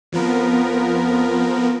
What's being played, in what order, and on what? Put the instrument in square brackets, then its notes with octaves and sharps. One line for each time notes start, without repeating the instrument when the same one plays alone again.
[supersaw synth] F2 F3 B3 A#4